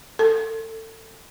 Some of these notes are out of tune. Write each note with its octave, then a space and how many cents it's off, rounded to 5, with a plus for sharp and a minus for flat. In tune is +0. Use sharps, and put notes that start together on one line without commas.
A4 +30